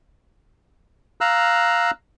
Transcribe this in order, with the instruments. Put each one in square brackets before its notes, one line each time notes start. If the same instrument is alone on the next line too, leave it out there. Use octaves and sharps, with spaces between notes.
[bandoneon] F5 A#5 E6 F#6